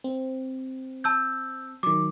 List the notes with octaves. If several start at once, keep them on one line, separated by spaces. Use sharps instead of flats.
C4
A5 E6 G6
D#3 F#3 D6